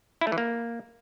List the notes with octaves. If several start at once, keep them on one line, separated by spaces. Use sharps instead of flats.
E4
A3
E3
A#3